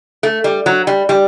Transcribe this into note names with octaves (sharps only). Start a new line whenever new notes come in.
A3
G3
F#3
G3
G3